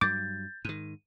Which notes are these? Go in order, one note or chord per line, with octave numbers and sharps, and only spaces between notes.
G2 F#3 D6 G6 A6
G#2 D#3 D#7